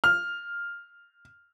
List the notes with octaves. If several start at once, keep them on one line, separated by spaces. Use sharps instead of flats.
F6